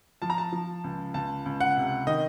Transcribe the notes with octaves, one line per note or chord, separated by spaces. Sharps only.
F3 A5
A#5
A5
F3
C#2
C#2 A5
C#2
F#5
C3
D#3 D#5